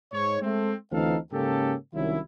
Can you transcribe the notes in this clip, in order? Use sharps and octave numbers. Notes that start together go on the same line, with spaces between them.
G#2 C#5
G#3 A3 C4
D2 E3 C4 D#4 A4 F5
G#2 C#3 A#3 C#4 G4 A4
C2 D#3 F#3 C#4 E4